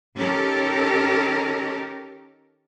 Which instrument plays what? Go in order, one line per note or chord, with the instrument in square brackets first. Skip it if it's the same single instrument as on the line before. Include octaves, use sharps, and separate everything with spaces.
[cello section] D#3 C#4 G4 A4 A#4